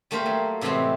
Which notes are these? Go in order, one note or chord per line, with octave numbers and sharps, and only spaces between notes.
G3 A3 A#3 A#4 C5
F#3
A2 C3 E3 G#3 A3 C4